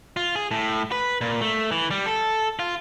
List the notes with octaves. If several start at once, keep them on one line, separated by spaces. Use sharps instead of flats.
F4
G#4
A2
B4
A#2
A3
E3
G3
A4
F4